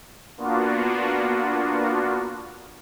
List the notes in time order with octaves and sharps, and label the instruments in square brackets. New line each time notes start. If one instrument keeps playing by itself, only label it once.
[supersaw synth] A#3 B3 D4 F4 F#4